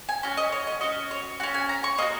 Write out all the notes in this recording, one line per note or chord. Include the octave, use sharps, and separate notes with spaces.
G#5
C#4 F#4
D#5
C#5
D#5
C#4 F#4 D#5
C#5
C#4 F#4 F#5
G#5
A#5
C#6
A#3 F#4 D#5